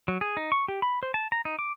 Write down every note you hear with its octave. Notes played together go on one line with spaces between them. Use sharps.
F#3
G#4
D#4
C#6
G4
B5
C5
A5
A#5
D#4
D6